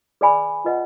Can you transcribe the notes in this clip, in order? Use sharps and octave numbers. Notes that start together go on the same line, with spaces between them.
G#4 B4 D5 G#5 B5
F4 B4 D#5 F#5